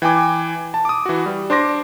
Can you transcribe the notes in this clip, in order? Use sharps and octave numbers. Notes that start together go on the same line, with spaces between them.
E3 G5 G#5 D6
A5
D6 D#6
E3 F#4
G3
D4 C5 C6 D6 A#6